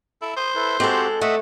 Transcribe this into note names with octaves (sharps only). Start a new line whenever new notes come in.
E4 A4
C5 D#6
E4 A4 B4
G#3 C4 F#4 G4 A4
A3 D#5 E5 F#5